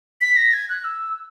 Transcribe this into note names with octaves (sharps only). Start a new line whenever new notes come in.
B6
A#6
G#6
F#6
E6